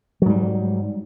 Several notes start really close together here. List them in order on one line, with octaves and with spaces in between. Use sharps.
F#3 G#2 G3